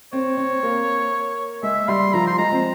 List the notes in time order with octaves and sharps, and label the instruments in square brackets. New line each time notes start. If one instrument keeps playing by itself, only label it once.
[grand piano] C4 [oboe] C#5
[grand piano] C4
A#3
[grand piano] G#3 [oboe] E5
[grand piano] G3 [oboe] C6
[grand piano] F3 [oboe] A#5
[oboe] C6
[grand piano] G#3 [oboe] A#5
[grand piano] C4